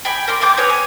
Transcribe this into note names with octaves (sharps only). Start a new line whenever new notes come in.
G5 G#5 B5
A#4 D5 C6
A#3 G5 D6 G6
G#4 B4 C#5
G#5